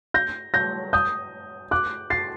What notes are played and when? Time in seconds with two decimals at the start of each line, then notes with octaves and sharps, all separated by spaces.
0.14 G6 A#6
0.54 G6 A#6
0.93 D#6 G6
1.71 D6 F#6
2.10 A6 C7